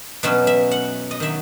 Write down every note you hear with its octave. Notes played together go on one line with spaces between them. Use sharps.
B2 F#3 C#4 E5
E5
F#5
D#5
D#3 F#3 E5